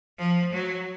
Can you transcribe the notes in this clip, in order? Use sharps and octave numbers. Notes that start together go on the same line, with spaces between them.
F3
F#3